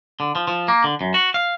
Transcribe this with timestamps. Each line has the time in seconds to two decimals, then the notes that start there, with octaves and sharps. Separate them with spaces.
0.20 D3
0.35 F3
0.48 F3
0.68 A#3
0.84 D3
1.01 F#2
1.14 F#4
1.34 F5